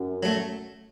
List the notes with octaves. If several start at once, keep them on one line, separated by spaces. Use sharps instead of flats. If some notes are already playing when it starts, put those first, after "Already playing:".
Already playing: F#2
F#3 A3